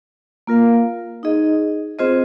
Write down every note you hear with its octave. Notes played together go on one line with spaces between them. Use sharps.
A#3 F4 A#4 F5
D#4 G#4 D#5
C4 F4 G#4 C5 D#5